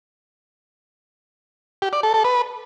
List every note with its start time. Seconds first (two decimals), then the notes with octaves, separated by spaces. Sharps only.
1.82 G4
1.93 D5
2.03 A4
2.14 A4
2.24 B4